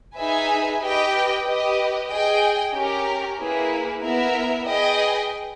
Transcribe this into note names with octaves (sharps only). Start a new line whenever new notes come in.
D#4 G#4 B4 E5 G#5
G4 B4 D#5 G5
G4 B4 D#5
G#4 D#5 G5
C#4 G4 A#4
A#3 E4 G#4 B4
B3 E4 A#4 E5
G#4 B4 D#5 G5